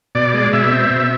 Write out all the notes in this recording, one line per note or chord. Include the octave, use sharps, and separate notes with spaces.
B2 D5
G#3
B2 E5
C4
B2